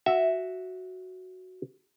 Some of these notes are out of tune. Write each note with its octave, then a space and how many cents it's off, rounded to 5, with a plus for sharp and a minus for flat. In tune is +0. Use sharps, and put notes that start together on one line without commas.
F#4 +0 E5 +0